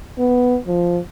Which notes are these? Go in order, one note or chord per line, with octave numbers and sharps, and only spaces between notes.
B3
F3